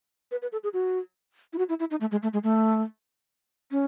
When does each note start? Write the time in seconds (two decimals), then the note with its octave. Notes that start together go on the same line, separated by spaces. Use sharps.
0.31 B4
0.42 B4
0.52 A4
0.64 G#4
0.73 F#4
1.53 E4
1.58 F#4
1.69 E4
1.80 E4
1.91 D#4
2.01 A3
2.11 G#3
2.23 A3
2.33 G#3
2.44 A3
3.71 C#4